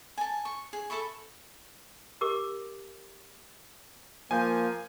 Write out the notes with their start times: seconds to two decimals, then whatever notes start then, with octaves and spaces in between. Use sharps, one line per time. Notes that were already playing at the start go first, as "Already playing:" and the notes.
0.18 G#5 A5
0.45 C#6
0.73 G#4
0.90 A4 E5 B5 C#6
2.21 G4 A#4 D6
4.31 F3 A#3 G#5 G6